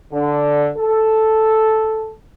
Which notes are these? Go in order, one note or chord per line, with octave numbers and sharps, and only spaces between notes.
D3
A4